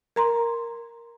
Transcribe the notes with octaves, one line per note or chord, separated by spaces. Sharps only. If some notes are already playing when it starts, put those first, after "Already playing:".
A#4 A#5 C6